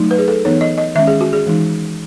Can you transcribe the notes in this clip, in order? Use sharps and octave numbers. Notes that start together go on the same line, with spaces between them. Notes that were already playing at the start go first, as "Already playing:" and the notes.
Already playing: F#3 A3 D#4
B4
G#4
A4
E3 B3 D#4 C#5
D#5
D#5
D#3 G#3 C#4 E5
G#4
F#4
G#4
E3 G#3 D#4